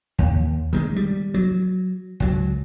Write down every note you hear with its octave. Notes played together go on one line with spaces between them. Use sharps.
D#2
D#3 G3 G#3
G3
F#3
C#2 F#3